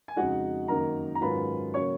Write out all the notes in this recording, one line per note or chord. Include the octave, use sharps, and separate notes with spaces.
G#5
F2 C#3 G#3 D#4 F#4 F#5
F#2 D#3 A#3 D#4 A#4 A#5
A#5
G#2 D#3 F#3 C#4 F4 B4 B5
C#3 F#3 A#3 C#5 C#6